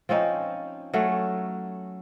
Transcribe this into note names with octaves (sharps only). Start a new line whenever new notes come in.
F3 C4 C#4 D#4
F#3 A3 C#4